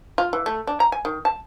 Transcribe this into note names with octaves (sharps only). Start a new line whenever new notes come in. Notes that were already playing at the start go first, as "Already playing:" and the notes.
F4
E3
A3
D4
A#5
G#5
D#3
A5